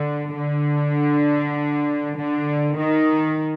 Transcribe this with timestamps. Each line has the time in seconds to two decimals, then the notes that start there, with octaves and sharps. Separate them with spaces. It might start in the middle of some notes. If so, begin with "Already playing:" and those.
Already playing: D3
0.37 D3
2.17 D3
2.78 D#3